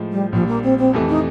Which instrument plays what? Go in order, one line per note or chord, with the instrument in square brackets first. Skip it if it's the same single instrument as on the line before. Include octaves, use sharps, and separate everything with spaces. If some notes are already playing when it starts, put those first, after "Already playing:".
Already playing: [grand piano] A2 F3 G#3
[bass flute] G3
[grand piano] A#1 A#2 G3 [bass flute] F3
[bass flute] A#3
C4
C4
[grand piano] F2 C3 E3 A3
[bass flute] D#4